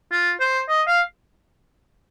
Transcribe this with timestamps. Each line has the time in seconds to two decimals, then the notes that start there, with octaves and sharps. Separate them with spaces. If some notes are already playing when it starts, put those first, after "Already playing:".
0.12 F4
0.40 C5
0.68 D#5
0.87 F5